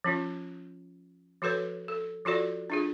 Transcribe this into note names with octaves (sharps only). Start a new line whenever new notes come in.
F3 C#4 F4
F3 F#4 A4 B4 C#5
A4
F3 F4 F#4 A4 D5
D4 F4 G#4